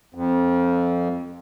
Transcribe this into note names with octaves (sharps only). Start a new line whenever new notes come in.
F2